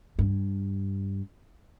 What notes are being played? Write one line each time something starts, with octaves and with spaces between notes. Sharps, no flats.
G2